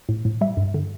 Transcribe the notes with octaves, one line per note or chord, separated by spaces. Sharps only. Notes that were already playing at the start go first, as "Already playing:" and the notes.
A2
A2
G3 E5
G2
D3